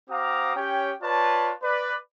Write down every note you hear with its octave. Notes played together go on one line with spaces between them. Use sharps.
C4 F#4 F5 A#5 D6 D#6
C#4 G4 C#5 G5
F4 B4 C#5 D5 A5
B4 D5